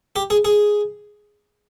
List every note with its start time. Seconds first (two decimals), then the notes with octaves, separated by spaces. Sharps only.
0.16 G4
0.30 G#4
0.45 G#4